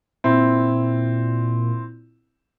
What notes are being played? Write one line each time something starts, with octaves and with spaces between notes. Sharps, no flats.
A#2 C4 E4